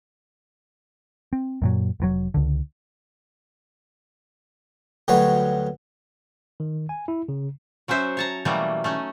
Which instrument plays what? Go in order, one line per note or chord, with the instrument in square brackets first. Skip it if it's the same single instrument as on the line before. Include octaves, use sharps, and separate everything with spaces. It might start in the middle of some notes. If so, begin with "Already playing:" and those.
[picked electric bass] C4
F#2 A#2 F#3
F1 G#2 F#3
C#2 D3
[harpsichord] D2 F#3 G3 B3 C#5
[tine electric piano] D#3
G#5
E4
C#3
[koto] F#3 C#4 F#4 C5 E5
C#5 A5 A#5
B2 E3 F#3 G3 A3 A#3
A3 C#4 D#4